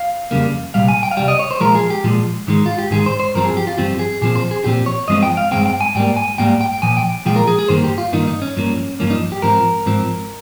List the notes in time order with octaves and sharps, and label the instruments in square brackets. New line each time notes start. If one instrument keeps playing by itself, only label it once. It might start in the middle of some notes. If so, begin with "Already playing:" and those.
Already playing: [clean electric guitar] F5
F2 C#3 G3 A#3
C2 A#2 G3 F5
G#5
G5
F5
C2 A#2 G3 G5
D#5
C#5
C5
A#2 F3 G#3 A#4
G#4
G4
A#2 F3 G#3
G#2 D#3 G#3
F4
G4
G#2 D#3 G#3 G#4
C5
C5
G2 F3 C4 A#4
G#4
G4
F4
G2 F3 C4 G4
G#4
A#2 F3 C4 G#4
C5
G#4
A#2 F3 C4 G4
C#5
G2 F3 G#3 C4 D#5
G5
F5
G2 F3 G#3 C4 G5
G5
G#5
G#2 G3 A#3 G5
G#5
G#2 G3 A#3 G5
G5
A#2 F3 G#5
G5
A#2 F3 G#3 G5
A#4
G#4
G#4
G2 D#3 A#3 C5
G4
F4
G2 D#3 A#3 D#4
D#4
C#4
G2 F3 A#3
G2 F3 A#3 C#4
D#4
G4
G#2 F3 C4 A#4
G#2 F3 C4